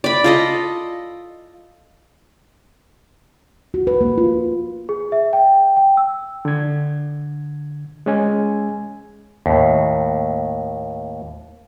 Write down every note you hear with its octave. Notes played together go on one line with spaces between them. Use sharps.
D5 B5
F4 A4 D#5
F#4
B4
A#3
F4
G#4
E5
G5
G5
E6
D3 G#6
G#3 C#4 G#5
D#2 A2